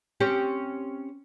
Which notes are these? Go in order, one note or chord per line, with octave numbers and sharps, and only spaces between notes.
C4 C#4 G4